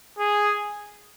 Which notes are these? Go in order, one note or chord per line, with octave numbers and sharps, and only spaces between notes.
G#4